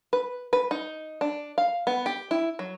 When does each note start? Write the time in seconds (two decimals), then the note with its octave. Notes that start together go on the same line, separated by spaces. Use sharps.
0.13 B4
0.53 B4
0.71 D#4
1.21 D4
1.58 F5
1.87 B3
2.06 G4
2.31 E4
2.59 F#3